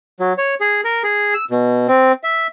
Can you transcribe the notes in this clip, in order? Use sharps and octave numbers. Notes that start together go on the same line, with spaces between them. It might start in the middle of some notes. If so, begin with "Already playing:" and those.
F#3
C#5
G#4
A#4
G#4
E6
B2
C4
E5